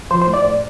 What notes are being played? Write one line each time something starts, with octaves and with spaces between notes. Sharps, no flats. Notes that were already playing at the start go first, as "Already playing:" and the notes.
F3 C5
C5
A2
D5
A2